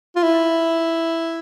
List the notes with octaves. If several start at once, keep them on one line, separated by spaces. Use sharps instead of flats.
F4
E4